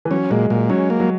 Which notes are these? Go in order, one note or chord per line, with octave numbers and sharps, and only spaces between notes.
E3
F#3 C#4
A#2 G#3
A#2 G#3
F#3 C#4
A#3
F#3